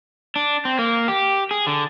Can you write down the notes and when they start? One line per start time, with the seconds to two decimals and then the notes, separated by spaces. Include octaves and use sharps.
0.36 D4
0.65 C4
0.79 A#3
1.08 G4
1.51 G#4
1.67 D3